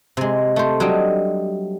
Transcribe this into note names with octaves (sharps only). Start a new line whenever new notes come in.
C3 G#3
A3 C5
F#3 G3 D4 D#4